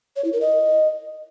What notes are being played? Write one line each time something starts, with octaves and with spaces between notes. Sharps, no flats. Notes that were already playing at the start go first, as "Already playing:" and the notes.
C#5
E4
A#4
D#5